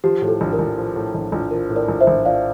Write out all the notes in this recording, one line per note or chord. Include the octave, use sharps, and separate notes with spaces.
F3 G4
A2
A4
A#1
A#4
A#1
F3
A2
A#1
A#1
F3 A#4
A2
A#4 D5
A#1
C5 E5
A#1
F3 D5 F5